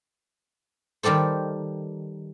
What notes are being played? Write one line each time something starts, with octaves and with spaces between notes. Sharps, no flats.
D#3 G3 G4 A4 C5